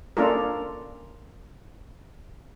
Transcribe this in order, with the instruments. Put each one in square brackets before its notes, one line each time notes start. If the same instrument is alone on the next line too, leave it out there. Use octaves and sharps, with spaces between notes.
[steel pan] A#3 C#4 D4 F4 A4 A#4